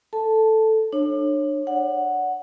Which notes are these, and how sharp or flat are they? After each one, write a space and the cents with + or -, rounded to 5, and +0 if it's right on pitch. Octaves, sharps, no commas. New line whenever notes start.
A4 +0 A5 +0
D4 +30 C#5 -20
D5 -45 F#5 +0